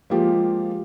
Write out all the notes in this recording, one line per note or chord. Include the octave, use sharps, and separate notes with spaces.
F3 G#3 A#3 F4 G4 G#4